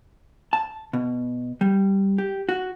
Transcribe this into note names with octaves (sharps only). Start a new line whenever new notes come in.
A5
B2
G3
G4
F#4